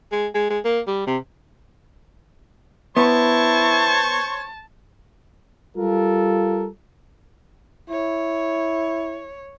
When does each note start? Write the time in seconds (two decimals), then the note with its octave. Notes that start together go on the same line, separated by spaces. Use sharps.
0.12 G#3
0.34 G#3
0.50 G#3
0.65 A#3
0.87 G3
1.07 C3
2.97 B3 E4 C5 C#5 A5 C#6
5.77 G3 F4 A4 A#4
7.89 E4 C#5